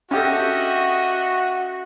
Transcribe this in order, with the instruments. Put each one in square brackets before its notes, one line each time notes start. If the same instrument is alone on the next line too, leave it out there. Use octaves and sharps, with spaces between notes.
[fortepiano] C#4 G4 A4 [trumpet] F#4 [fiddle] D#5 E5